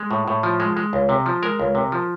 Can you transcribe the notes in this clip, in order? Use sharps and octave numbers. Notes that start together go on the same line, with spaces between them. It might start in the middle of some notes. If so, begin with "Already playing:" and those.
Already playing: G#3
A2
A2
F3
G#3
G#3
C#2
C3
F3
G#3 A#4
C#2
C3
F3